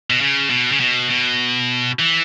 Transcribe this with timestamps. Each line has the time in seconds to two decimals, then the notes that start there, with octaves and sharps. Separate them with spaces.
0.10 B2
0.21 C#3
0.50 B2
0.72 C#3
0.80 B2
1.10 B2
1.99 E3